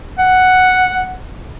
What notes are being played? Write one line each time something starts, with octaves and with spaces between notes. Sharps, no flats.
F#5